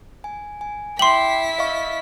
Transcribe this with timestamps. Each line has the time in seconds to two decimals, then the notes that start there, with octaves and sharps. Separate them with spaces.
0.24 G#5
0.61 G#5
0.99 E4 G5 C6 D6 B6 C7 F#7
1.59 D#5 F5 C#6